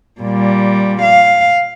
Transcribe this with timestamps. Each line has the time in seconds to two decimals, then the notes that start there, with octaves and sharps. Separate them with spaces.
0.21 A#2 G3
1.03 F5